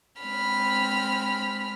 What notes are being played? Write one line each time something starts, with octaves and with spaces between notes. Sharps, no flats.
G#3 C4 B5 F6